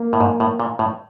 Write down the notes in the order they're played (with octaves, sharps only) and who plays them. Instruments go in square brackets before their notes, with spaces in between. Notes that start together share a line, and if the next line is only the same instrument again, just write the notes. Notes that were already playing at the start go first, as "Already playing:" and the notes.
Already playing: [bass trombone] A#3
[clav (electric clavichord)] A2
G#2
A2
A#2
A2